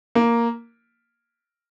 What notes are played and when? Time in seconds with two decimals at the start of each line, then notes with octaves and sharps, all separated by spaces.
0.15 A#3